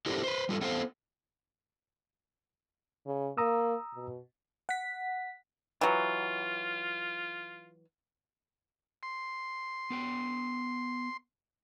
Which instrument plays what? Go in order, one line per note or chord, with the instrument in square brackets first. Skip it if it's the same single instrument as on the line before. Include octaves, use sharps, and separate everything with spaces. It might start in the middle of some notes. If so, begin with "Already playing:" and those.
[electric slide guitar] D4 E4 G4 A4 A#4 C5
B4 C5
G3 F4 A4
A3 B3 A4 C5 F5
[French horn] C#3
[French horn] A#3 [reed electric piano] A#5 D#6 E6
[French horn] B2
[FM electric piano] F#5 B6
[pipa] E3 F#3 [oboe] F4
[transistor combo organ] C6
[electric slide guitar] B3 A#4 G5